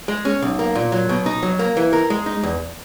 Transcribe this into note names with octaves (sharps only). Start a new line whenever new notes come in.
G#3
C#4
B1
A#3
A#2
F#3
B2
D#4
F#3
A#3
E3
A#4
G#3
D#4
E2